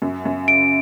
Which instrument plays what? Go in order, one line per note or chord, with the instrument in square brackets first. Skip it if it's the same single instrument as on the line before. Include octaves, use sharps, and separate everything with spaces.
[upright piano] F#2
F#2
[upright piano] C#3 [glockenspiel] D7